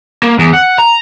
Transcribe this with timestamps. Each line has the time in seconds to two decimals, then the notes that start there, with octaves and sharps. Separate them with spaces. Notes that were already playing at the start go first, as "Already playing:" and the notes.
0.23 A#3
0.39 E2
0.53 F#5
0.78 A#5